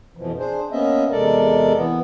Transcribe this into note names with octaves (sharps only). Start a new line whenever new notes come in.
F2 B2 E3 F3
D4 G#4 C5
A#3 B3 C#4 D#5 E5
E2 C3 G#3 A4 A#4 D5
E3 B3